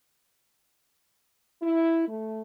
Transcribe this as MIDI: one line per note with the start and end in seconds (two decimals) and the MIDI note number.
1.62 2.07 64
2.08 2.41 57